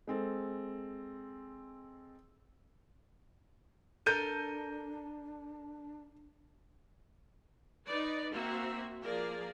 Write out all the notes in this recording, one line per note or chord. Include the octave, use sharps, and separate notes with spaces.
G#3 C4 A4
D4 A4 A#4 G6 D#7
D#4 B4 D5
A#3 C4 F#4 E5
F3 A#3 G#4 A#4 D5